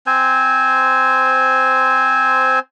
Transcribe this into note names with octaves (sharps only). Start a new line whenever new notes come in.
C4 C5 G#5